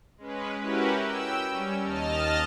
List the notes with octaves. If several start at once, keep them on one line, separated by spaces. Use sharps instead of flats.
G#3 C#4 B4
C#4 E4 F#4 G4 A#4 B4
G5 E6
G3 C#4
D#2 D#5 A5 F6